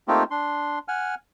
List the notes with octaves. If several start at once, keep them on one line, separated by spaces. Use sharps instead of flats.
A3 A#3 C4 D#4 F4 G4
D4 C6
F#5 G#5 F6